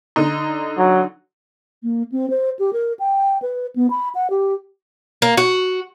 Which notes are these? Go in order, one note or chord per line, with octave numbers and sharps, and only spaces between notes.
D3 D#4
F#3
A#3
C4
C5
G4
A#4
G5
B4
B3
B5
F#5
G4
A#3
F#4